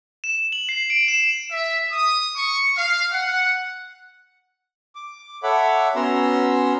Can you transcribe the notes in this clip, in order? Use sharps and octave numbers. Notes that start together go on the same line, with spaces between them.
E7
F#7
C7
D7
E7
E5
D#6
C#6
F5
F#5
D6
A4 C#5 E5 F#5 B5 D6
B3 C#4 F#4 A#5 C6 E6